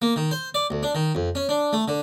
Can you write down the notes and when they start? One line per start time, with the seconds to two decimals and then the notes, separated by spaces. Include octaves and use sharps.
0.02 A#3
0.16 D#3
0.31 C5
0.54 D5
0.70 D2
0.83 D4
0.95 D#3
1.15 F2
1.35 C#4
1.49 D4
1.73 A3
1.88 D3